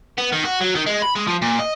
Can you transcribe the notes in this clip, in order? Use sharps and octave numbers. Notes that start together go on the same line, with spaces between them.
B3
D#3
F#4
F#3
D#3
G#3
B5
G#3
F3
A#2
D#5